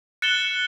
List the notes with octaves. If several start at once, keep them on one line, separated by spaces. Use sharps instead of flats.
F#6 A6 C#7 E7 G7